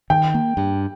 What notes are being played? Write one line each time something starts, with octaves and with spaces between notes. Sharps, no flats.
D#3 G5
A#3
G2